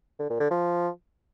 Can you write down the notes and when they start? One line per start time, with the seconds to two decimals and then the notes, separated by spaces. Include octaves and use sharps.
0.19 D3
0.30 A#2
0.40 D3
0.51 F3